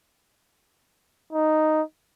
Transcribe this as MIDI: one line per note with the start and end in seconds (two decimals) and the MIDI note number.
1.33 1.82 63